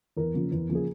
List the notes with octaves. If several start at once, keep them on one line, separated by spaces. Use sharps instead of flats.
E2 A#4
C#3 F3 A#3
E2
C#3 F3 A#3
G#4